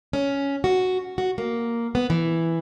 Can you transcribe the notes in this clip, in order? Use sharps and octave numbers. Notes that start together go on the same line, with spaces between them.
C#4
F#4
F#4
A#3
B3
E3